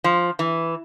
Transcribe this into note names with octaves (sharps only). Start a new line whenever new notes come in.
F3
E3